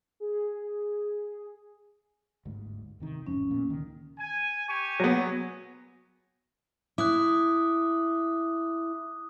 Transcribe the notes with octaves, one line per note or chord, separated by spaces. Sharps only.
G#4
G1 D2 G#2
G1 C3 D#3
A1 F2 G#2 C#4
A#2 B3
C#2 D#3
G#5
G4 G#5 C#6
F#3 B3
E4 D6 D#6 F#6